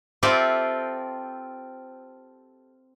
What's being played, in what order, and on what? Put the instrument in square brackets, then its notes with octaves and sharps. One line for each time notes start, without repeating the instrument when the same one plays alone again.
[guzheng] C4 F4 G4 A4 D5 E5